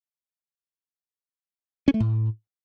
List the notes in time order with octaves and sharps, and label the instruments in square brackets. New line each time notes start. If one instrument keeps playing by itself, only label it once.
[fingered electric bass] C#4
A3
A2